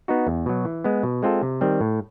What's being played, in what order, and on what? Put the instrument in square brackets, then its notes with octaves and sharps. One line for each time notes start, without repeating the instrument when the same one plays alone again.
[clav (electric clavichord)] B3 D#4 F#4
E2
B2 F#3
E3
G#3 B3
B2
G#3 C4 F4 A4
C3
D#3 G3 C4
A2